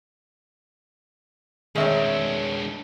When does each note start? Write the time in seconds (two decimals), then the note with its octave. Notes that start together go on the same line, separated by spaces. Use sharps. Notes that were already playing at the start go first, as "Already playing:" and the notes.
1.76 D#3 G#3 C4 D4 G#4 C#5 E5